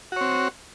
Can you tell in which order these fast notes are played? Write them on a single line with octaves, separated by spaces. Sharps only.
F#4 C#5 C4